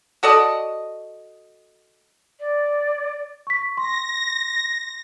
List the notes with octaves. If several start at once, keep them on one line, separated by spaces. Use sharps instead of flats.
F#4 A4 D5 D#5
D5
C#6 B6
C6 A#6